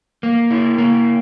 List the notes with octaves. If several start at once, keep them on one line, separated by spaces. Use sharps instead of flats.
A#3
E4
A#3